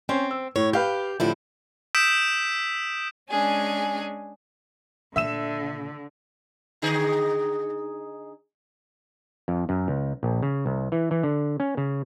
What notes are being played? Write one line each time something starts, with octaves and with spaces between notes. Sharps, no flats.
C4 C#4 C5
E6
A2 C#5
G4 B4 F5 G6
A2 D3 F3 E4
D#6 E6 G6 B6 D7 E7
G#3 C#4 D4 G#4 G#5
A#2 D3 E5 E6 E7
D3 D#4 G#4
F2
F#2
C#2
A#1
C#3
C2
E3
E3
D3
C#4
C#3